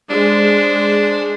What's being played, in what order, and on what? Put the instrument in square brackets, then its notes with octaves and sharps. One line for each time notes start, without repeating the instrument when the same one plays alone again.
[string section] G#3 C5 [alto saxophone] D4